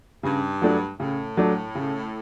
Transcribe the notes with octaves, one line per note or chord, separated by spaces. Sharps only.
G2 C#3
F#3 A3 D4
A2 C#3
F#3 A3 D4
C#3